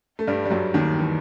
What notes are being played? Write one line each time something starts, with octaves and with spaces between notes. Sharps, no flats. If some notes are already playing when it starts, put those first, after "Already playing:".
A3
G2 G3
G3
F#2 F#3
D#2 D#3
E3